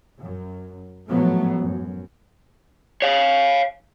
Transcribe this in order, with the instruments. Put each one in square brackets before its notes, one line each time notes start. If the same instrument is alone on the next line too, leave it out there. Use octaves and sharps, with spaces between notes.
[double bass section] F#2
A1 G#2 F3 F#3 A3 B3
F#2
[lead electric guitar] C#5 F5